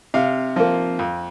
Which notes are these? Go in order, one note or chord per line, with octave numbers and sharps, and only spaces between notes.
C3 F5
F3 A#3
F2